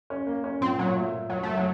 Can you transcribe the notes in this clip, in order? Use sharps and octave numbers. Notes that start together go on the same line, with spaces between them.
C#4
A#3
C#4
A#2 C4
A#2 F#3
A3
A#2
F#1 F#3
F#1 A3
F#3